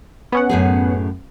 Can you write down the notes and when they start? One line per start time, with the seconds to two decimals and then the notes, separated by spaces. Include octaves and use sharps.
0.32 B3 C#4 F#5
0.49 F#2 A2 G#4